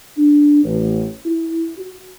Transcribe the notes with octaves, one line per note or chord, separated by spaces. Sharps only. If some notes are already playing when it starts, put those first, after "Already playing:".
D4
A1
E4
F#4